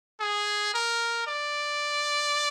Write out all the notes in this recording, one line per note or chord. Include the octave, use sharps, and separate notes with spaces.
G#4
A#4
D5